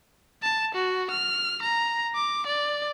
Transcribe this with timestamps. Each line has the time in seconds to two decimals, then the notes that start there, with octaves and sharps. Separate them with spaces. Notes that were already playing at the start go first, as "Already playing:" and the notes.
0.42 A5
0.75 F#4
1.10 F6
1.62 A#5
2.16 D6
2.46 D5